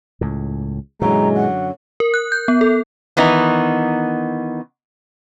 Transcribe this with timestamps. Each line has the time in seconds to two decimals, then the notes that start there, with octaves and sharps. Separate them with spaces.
0.21 C#2 A2
1.02 F#2 A#2 D3 E3 F#3 G#3 A#5
1.35 F#5
2.00 A#4
2.14 F#6
2.32 G6
2.48 B3
2.61 A4
3.17 D#3 E3 B3 D#4